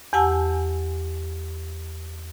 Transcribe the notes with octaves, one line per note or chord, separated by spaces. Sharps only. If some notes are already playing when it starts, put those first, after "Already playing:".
E2 G4 F#5 G#5 A5 E6